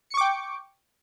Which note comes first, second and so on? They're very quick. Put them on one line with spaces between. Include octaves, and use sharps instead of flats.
C#7 C#6 D6 G5